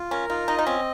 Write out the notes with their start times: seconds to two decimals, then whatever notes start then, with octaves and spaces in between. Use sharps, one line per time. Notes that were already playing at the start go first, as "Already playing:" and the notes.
Already playing: F4
0.11 C#4 A#4
0.29 D#4 F4
0.48 D#4 D#5
0.59 D#4
0.67 C4 C#4